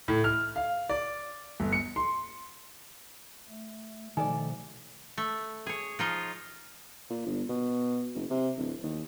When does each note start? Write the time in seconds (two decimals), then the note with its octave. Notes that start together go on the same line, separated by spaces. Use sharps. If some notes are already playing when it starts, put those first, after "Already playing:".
0.08 A2
0.24 F6
0.56 F5
0.89 D5
1.60 G1
1.73 C#7
1.96 C6
3.48 A3
4.17 B2 D#3 F3 A3 A4 D5 G#5
5.17 A3
5.66 G#4 C#5
5.99 F3 D#4 F4
7.10 A#2
7.26 G1
7.49 B2
8.15 F#1
8.30 C3
8.58 D1
8.83 D#2